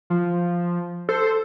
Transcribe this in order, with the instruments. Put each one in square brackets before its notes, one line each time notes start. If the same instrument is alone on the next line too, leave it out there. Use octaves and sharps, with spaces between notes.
[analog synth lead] F3
[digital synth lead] A4 [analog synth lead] C5